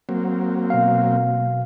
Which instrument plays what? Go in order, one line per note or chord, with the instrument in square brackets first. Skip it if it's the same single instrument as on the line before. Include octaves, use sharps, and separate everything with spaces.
[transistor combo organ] F#3 A#3 C4
[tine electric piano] B2 F5